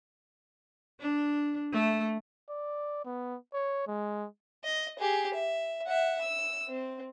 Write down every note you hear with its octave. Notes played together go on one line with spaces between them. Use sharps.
D4
A3
D5
B3
C#5
G#3
D#5
G4 G#4
E5
E5 F#5
E6
C4